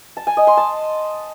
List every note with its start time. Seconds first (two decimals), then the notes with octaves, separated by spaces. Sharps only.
0.17 A5
0.27 G#5
0.37 D#5
0.47 C6
0.57 A5